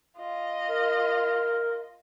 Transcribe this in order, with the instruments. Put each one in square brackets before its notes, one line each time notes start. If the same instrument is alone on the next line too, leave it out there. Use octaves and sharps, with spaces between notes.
[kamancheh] F4 D#5
[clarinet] A#4